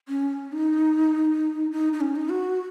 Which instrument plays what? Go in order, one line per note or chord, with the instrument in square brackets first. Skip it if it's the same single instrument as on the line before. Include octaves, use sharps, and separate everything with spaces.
[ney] C#4
D#4
D#4
D#4
C#4
D#4
F#4